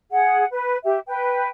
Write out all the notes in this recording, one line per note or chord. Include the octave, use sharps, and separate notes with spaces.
G#4 F#5
B4
G4 E5
B4 G5